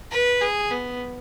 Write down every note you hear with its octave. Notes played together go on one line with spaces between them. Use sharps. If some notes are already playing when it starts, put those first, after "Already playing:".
B4
G#4
B3